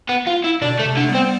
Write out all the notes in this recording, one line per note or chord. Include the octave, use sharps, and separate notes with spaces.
B3
F4
E4
B2 D3 D4
A3
C3
D3
A3
G3 B3
C4